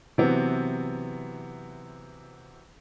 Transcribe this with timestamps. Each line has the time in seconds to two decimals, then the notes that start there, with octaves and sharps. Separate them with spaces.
0.18 C3 E3 F#3 B3 C4